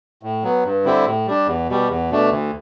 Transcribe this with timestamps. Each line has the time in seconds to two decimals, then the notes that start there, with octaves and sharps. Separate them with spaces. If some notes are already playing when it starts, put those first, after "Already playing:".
0.23 A2
0.43 F#3 B3
0.65 G2
0.85 D3 G3 C4 E4
1.06 A2
1.27 G3 D4
1.47 E2
1.69 B2 G3
1.89 E2
2.10 B2 A3 D4
2.31 D2